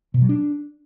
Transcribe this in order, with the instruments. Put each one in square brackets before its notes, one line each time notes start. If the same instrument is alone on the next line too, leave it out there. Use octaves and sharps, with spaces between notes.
[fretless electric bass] B2
F#3
D4